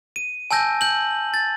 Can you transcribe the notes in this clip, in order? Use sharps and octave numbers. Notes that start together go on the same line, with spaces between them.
D#7
G#5 A5 E6 G6 A#6
G6 F#7
A6